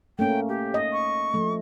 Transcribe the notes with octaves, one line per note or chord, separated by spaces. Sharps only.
A3 A#3 C#4 G5
G4
D#5
C#6
F3 A3